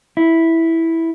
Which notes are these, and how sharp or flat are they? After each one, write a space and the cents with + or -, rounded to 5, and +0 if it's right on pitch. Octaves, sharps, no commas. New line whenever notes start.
E4 -5